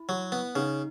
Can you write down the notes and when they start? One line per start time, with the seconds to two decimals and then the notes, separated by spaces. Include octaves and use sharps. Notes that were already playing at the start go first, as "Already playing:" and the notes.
Already playing: E4
0.09 F#3
0.32 B3
0.56 C#3 D#4